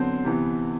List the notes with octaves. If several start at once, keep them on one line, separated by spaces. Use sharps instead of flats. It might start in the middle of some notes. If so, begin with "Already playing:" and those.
Already playing: D3 F#3 B3 C4 C5
C3 E3 B3